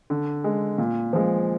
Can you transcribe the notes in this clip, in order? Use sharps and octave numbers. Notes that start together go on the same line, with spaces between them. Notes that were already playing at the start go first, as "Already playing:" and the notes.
D3
G#3
A#2
F3 G#3